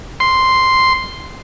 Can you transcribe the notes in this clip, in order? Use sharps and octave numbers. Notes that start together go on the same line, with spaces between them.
C6